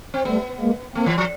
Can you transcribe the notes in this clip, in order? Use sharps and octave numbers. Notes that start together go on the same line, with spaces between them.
C4
G3 A3 B3
G#3 A#3
A3 A#3 C4
E3
F3